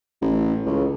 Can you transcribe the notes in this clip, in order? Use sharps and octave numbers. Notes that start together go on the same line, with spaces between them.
A1
C#2